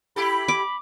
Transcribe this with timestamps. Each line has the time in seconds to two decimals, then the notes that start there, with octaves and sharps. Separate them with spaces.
0.16 E4 G4 A4 B5
0.48 D6